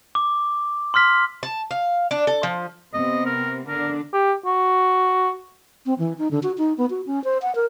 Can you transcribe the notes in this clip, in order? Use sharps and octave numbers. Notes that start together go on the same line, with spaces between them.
D6
C6 E6 F6 B6
A5
F5
D4
A4
F3
C3 B3 C4 D#5
A#4
D3 D4 A#4
G4
F#4
C4
E3
D#4
D3
F#4
D#4
B3
F#4
C#4
C5
F#5
A#4